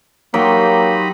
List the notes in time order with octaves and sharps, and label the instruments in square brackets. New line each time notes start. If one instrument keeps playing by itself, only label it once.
[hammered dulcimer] F#3 [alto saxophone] A#3 [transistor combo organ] D#4 B5 [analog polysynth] G4 C6